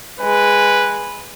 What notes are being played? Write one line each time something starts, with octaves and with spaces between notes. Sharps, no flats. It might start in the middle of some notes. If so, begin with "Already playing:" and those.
G#3 B4